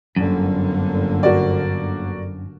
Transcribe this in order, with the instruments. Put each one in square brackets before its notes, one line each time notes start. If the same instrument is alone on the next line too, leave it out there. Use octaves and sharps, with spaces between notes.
[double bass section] G1 D3 A#3 [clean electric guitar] F#2
[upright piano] F#4 A#4 D5